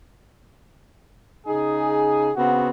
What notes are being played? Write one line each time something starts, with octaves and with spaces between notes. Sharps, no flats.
C#3 D#4 G#4
C#3 B3 C4 F#4